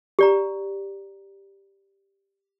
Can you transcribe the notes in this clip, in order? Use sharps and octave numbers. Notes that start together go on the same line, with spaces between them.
G4 D5 A#5